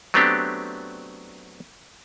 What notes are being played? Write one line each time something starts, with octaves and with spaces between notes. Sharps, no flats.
F#3 A3 B3 C4 D4 G4